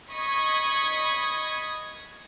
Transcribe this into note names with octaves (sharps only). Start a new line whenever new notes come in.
D#5 B5 C#6 D#6 G#6 B6